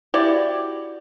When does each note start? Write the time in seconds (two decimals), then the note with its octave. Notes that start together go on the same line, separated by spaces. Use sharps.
0.14 E4 F#4 G4 D5